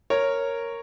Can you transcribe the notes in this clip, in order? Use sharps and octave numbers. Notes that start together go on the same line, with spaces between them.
A#4 C#5